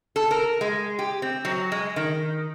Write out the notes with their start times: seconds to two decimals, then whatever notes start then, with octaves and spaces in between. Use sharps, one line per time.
0.16 A4
0.31 A#4
0.61 G#3
0.99 G4
1.22 C4
1.45 F#3
1.72 G#3
1.96 D#3